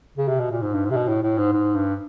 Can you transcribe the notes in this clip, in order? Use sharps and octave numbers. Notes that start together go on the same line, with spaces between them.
C#3
C3
B2
A#2
G#2
G2
G#2
C3
B2
A2
A2
G#2
G#2
G2